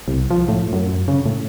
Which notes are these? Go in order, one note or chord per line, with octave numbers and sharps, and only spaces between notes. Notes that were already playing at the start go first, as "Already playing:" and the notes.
C2
F3
A2
F#2
C#3
A2